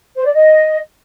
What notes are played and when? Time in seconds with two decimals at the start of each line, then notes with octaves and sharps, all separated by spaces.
0.16 C5
0.25 D5
0.33 D#5